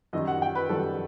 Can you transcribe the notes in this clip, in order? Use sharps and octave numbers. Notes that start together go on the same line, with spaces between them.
F#2 D#3 G3 D#5
F#5
G5
B4
F#2 D#3 G3 A4